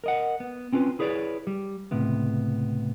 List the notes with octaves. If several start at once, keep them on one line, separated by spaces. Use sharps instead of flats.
A#4 D#5 F#5
B3
C4 C#4 F4 A#4 B4
E4 G#4 B4 C#5 D5
G3
C#2 A2 C3 B3